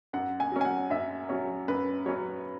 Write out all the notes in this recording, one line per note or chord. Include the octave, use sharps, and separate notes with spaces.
F#2 F#5
G#5
F#3 C#4
G#5
F#5
F#2 E5
F#3 C#4 C#5
F#2 B4
F#3 C#4 C#5